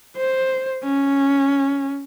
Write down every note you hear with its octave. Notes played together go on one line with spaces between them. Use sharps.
C5
C#4